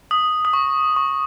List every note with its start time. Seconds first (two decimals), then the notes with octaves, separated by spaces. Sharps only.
0.11 D#6
0.45 D#6
0.53 C#6
0.96 C#6